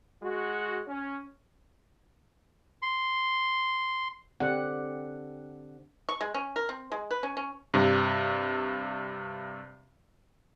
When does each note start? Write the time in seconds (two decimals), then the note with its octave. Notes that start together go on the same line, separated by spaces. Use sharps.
0.23 G#3 F#4
0.88 C#4
2.82 C6
4.40 D3 C4 G4 F#5
6.09 C#6
6.21 G#3
6.34 C#4
6.56 A#4
6.69 C4
6.92 G#3
7.11 B4
7.23 C#4
7.37 C#4
7.74 G2 C3